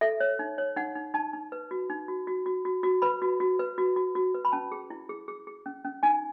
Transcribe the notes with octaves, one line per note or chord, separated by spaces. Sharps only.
A4 E5
C#5
D#4
C#5
D#4 F#5
D#4
D#4 A5
D#4
B4
F#4
D#4
F#4
F#4
F#4
F#4
F#4
B4 B5
F#4
F#4
B4
F#4
F#4
F#4
B4
B5
C#4 A5
G#4
E4
G#4
G#4
G#4
C#4
C#4
D#4 G#5